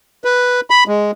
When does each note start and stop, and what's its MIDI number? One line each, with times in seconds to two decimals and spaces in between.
0.24 0.61 71
0.70 0.84 83
0.88 1.11 56